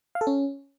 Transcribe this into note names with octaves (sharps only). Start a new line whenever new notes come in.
F5
A4
C#4